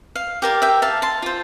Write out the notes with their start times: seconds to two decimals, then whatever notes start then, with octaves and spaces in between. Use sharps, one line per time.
0.15 F5
0.42 G4 A#4 D5 F5
0.62 E5 G5
0.82 F5 A5
1.02 A5 C6
1.22 F4 C5